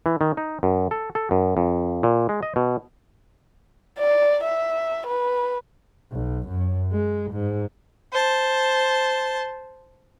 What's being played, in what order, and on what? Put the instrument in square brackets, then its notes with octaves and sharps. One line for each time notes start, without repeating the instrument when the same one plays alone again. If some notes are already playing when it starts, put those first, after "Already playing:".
[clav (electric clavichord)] E3
D#3
D#4
F#2
A4
A4
F#2
F2
A#2
G#3
D#5
B2
[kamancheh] D5
E5
B4
[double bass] B1
F#2
G#3
G#2
[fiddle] C5 A5